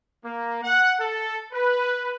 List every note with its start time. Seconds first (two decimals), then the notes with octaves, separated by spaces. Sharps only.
0.24 A#3
0.62 F#5
0.99 A4
1.52 B4